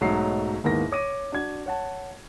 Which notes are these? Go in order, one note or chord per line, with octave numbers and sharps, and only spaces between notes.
B1 G#2 F#3 A3 C7
D#2 G#2 A#3 B3 E4 A#6
C#5 D6 A#6 D#7
D4 F#4 G#6
C#5 F#5 A5